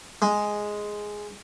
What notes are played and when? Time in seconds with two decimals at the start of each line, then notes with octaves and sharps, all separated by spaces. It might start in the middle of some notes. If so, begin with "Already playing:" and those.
0.22 G#3